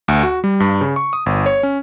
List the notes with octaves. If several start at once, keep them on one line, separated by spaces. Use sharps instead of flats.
D2
F#4
G3
G2
C#3
C#6
D#6
G1
C#5
C#4